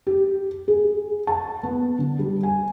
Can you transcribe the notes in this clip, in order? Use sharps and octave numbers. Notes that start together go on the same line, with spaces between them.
G4
G#4
A5
B3
D3
G3
G#5